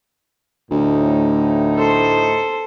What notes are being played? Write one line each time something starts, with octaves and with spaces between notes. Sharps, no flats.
D2 A2 D#4
A4 C5